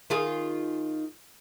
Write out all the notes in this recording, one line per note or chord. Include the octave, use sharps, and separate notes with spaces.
D#3 F4 G#4